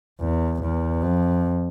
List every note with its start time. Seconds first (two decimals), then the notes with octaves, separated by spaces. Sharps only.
0.21 E2
0.62 E2
1.02 F2